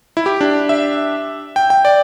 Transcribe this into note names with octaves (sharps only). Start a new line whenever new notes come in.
E4
G4
D4
E5
G5
G5
D5